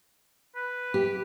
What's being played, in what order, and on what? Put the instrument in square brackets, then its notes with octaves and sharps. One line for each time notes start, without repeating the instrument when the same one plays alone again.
[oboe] B4
[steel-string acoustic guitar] G4